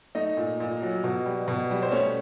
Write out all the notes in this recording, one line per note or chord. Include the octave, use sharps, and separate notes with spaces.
A3 D#4 D#5
A#2
A#2
F#3
B2
G3
B2
G3
C5
A3 C#4 C#5